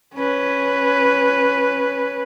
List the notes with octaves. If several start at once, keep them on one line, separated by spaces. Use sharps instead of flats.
C#4 B4